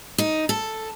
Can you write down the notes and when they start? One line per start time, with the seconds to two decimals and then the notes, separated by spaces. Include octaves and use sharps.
0.18 D#4
0.49 A4